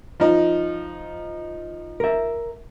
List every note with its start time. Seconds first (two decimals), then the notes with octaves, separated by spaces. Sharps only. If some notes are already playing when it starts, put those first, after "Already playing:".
0.20 F3 D#4
2.00 A#4 E5